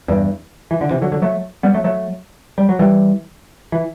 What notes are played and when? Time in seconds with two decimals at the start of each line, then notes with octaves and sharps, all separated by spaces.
0.08 E2 G2
0.71 E3
0.81 D3
0.91 C3 E3
1.02 D3 F#3
1.12 D3 F#3
1.22 F#3 A3
1.63 G3 B3
1.74 F#3 A3
1.84 F#3 A3
2.58 G3
2.69 F#3
2.79 E3 G3
3.72 E3